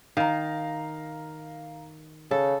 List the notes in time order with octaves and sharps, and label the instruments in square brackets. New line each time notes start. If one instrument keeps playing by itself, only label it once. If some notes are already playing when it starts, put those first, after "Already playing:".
[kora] D#3 [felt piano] F5 A#5
[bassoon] C#3 [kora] A4